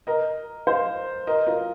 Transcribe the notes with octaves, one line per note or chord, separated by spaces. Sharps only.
A#4 D#5
C5 F5
A#4 D#5
F4 A#4